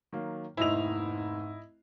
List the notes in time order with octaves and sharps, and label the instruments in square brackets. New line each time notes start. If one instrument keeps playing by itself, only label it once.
[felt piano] D#3 F#3 A#3
[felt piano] F1 D#2 C5 [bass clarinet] G#2 [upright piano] E4 D#5 F7